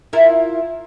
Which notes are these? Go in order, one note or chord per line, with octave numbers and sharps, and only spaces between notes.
E4 F4 A#4